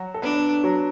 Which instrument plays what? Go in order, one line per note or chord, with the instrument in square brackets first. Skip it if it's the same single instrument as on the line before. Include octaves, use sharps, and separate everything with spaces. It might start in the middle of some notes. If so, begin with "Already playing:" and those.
Already playing: [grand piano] F#3 F#4
A4
[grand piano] B3 B4 [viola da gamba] D4
[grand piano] F#3 F#4